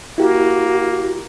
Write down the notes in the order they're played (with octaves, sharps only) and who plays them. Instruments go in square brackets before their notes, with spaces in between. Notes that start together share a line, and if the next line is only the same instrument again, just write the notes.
[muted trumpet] A#3 [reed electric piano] E4 G4 [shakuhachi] F#4